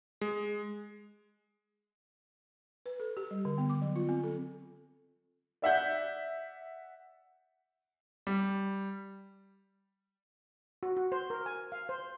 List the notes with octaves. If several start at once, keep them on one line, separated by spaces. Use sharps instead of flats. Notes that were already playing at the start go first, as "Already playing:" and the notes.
G#3
B4
A4
G4
G3
D3
B3
D6
F#3
F4
C4
A4
D5 E5 F#5 G6
G3
F#4
F#4
C5
A#4
G#5
F5
C5